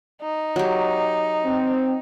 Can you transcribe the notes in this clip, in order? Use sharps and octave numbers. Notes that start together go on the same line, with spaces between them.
D#4
F#3 G4
C4